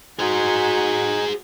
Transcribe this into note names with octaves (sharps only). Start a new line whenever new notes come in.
D#4 F#4 G#4 C5 G#5